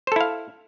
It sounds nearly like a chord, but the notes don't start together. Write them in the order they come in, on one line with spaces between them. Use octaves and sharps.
C5 A4 E4 F5